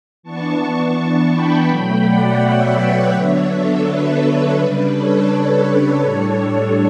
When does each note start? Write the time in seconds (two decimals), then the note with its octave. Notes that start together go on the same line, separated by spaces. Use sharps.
0.23 E3 B3 D4 A5 C#6
0.59 A5 C#6
1.32 G5 B5
1.68 B2 F#3 A3 G5 B5
2.04 D5 F#5
2.40 C#5 E5
2.76 B4 D5
3.12 D3 F#3 B3 D4 C#5 E5
3.48 A4 C#5
3.85 B4
4.57 C#3 G3 D4 B4
4.93 A4 C#5
6.02 A2 G3 D4 A4 C#5